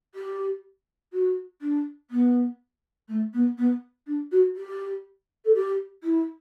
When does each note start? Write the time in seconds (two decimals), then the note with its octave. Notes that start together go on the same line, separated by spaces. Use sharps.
0.14 G4
1.13 F#4
1.61 D4
2.10 B3
3.08 A3
3.33 B3
3.58 B3
4.06 D4
4.31 F#4
4.56 G4
5.45 A4
5.54 G4
6.03 E4